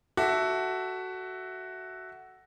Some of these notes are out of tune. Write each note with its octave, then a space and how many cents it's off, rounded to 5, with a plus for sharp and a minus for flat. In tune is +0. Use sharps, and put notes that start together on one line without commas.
F#4 +10 A4 +0 E5 +0